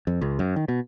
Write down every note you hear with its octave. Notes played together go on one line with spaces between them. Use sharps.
F2
C#2
F#2
D#3
B2